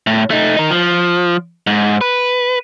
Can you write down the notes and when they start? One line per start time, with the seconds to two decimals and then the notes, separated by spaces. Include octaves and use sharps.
0.07 A2
0.31 A3 D#4
0.57 D#4 A#4
0.70 F3
1.67 G#2
2.01 B4